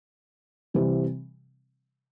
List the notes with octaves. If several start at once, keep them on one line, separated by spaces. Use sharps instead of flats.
C3 E3 G3 C4